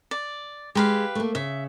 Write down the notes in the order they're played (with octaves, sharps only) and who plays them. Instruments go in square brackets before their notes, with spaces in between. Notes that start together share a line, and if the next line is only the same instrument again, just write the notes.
[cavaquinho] D5
[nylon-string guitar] G#3 [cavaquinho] G4 B4 F5
[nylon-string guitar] A3 A#3
[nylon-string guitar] C#3 [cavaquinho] E5